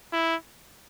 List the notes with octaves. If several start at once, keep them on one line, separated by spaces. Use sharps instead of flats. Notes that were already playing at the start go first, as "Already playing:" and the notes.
E4